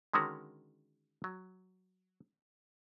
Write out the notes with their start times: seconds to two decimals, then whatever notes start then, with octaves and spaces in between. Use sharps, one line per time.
0.13 D3 D#3 G#3 C#4 F#4 A#4
1.24 F#3